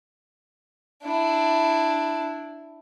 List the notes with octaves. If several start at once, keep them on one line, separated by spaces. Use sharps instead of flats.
D4 E4